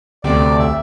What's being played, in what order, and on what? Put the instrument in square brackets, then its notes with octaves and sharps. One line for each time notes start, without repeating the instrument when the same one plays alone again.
[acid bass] D2 [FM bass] C3 [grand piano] A3 C4 G4 [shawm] D5
[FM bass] B1 [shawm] E5